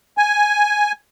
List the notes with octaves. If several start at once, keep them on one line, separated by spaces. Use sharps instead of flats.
G#5